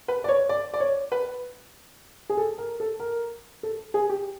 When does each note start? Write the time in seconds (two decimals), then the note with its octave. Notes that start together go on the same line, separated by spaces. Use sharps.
0.08 B4
0.24 D5
0.29 C#5
0.49 D5
0.74 D5
0.80 C#5
1.12 B4
2.29 G#4
2.37 A4
2.58 A#4
2.80 A4
3.00 A#4
3.63 A4
3.94 G#4
4.09 G4